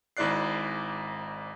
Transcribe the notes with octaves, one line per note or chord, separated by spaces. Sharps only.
G#1 G#2 E4 D5 F#6 C7